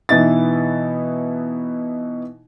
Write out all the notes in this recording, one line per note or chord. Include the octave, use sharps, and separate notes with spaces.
B2 E3 D#4 E4 A6